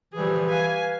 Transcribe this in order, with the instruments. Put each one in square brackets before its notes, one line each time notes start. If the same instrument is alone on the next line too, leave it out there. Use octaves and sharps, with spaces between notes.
[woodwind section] A#2 D3 F3 [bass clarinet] E3 [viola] G3 G#4
[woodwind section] B4 F5 [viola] G#5